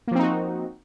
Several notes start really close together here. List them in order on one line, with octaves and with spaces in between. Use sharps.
A#3 F3 C4 D#4 F#4